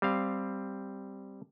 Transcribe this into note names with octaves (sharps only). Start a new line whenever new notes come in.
G3 C4 F5